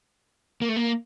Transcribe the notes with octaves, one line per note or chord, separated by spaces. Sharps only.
A#3
A3
A#3